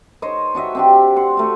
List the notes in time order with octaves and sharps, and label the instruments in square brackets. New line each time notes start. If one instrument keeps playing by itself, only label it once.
[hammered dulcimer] D#4 C5 C#5 D#5
D4 F#4 D#5 E5
C4 D4 G4
C5 F#5
A3 F#4